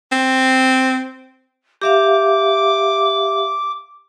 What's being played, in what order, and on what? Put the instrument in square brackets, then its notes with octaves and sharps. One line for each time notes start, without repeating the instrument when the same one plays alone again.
[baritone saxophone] C4
[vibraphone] G4 E5 F5 [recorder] D6